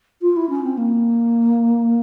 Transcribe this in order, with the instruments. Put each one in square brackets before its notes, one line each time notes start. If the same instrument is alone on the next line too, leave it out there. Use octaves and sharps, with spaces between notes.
[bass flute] F4
E4
C#4
C4
A#3